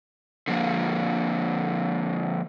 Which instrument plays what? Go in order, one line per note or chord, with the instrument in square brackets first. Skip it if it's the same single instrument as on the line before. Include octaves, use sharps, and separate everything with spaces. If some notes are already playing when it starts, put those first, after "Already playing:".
[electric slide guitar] D3 F3 A#3